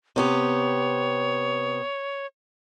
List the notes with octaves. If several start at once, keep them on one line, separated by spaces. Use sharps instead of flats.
C3 B3 G4 C#5